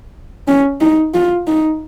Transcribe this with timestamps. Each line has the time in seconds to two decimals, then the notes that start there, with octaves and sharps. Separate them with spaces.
0.48 C#4
0.81 D#4
1.14 F4
1.47 D#4